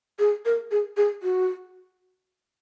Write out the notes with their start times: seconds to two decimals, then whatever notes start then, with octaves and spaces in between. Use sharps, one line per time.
0.19 G#4
0.45 A#4
0.71 G#4
0.97 G#4
1.23 F#4